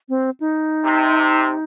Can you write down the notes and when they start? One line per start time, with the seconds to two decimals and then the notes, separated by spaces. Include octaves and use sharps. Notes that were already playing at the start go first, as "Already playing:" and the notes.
0.09 C4
0.40 D#4
0.84 C3